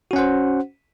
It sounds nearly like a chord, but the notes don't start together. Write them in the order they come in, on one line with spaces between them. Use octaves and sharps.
F#4 C#4 F#5 C5